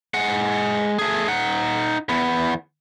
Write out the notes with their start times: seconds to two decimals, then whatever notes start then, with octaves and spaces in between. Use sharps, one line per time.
0.14 G#3 F#5
0.99 A3 G#4
1.28 D#4 F#5
2.09 E2 B3